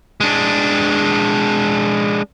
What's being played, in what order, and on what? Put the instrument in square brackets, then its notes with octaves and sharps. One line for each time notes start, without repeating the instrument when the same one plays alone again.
[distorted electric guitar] G#3 D4